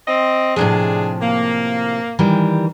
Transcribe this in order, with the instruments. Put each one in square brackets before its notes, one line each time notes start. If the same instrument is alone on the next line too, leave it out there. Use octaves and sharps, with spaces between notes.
[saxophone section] C4 D#5
[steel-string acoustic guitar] A2 C3 F3 [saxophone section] D4 G#4
[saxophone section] A#3
[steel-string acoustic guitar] D#3 E3 G3